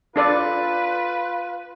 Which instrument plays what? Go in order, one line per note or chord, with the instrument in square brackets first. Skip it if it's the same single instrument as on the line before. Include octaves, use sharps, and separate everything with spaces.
[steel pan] D4 A4 D5 [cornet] F4 [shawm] B4